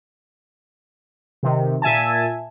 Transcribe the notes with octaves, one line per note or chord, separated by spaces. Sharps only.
C3 D#3
A#2 E5 G#5 A5